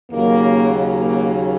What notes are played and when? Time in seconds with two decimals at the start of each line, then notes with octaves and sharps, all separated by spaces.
0.11 D#2 C#3 F#3 A#3
0.98 A#3